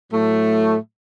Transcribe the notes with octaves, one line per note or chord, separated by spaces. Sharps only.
A2 F#3 A3